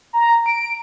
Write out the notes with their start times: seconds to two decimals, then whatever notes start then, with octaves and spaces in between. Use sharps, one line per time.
0.13 A#5
0.46 D7